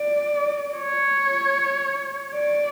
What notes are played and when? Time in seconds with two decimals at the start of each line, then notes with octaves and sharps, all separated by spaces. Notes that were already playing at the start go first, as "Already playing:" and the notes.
Already playing: D5
0.77 C#5
2.34 D5